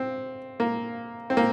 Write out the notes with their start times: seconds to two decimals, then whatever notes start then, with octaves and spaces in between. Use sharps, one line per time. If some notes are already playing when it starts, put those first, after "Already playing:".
Already playing: C4
0.60 A#3
1.30 C4
1.37 A#3